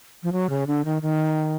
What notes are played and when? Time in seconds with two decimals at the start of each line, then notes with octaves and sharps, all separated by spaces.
0.23 F3
0.32 F#3
0.50 C#3
0.67 D3
0.85 D#3
1.02 D#3